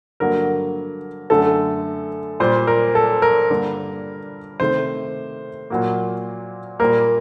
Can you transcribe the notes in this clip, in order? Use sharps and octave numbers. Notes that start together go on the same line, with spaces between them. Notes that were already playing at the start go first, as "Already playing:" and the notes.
G2 D3 F#3 A#3 A#4
F#2 D3 A3 A4
A#2 G3 A#3 C5
A#4
A4
A#4
G2 D3 G3 A#3
C3 D#3 A3 C5
A#2 F#3 A#3
A#2 G3 A#3 A#4